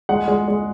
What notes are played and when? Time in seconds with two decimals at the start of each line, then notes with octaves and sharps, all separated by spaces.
0.09 G#3 F#5
0.28 G#3
0.48 G#3